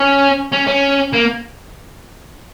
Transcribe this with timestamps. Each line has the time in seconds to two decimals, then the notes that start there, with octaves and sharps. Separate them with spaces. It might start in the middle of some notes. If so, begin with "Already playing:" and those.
Already playing: C#4
0.53 C#4
0.67 C#4
1.13 A#3